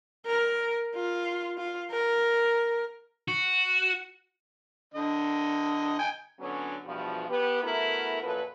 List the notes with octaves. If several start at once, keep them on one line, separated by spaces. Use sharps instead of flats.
A#4
F4
F4
A#4
F#4
D3 D#5
G5 G#5
D3 F#3 B3 C#4
E2 G2 B2 F3
B3 G4 B4
A3 B3 E4 F#4 A#4
F#2 A#2 F3 F#3 A4 B4